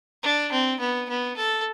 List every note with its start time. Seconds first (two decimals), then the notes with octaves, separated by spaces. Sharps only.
0.23 D4
0.52 C4
0.80 B3
1.09 B3
1.37 A4